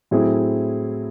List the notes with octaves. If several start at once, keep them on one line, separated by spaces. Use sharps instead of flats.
A2 F#3 C4 E4 G#4